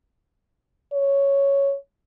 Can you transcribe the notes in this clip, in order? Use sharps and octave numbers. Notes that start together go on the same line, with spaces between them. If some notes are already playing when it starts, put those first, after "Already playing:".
C#5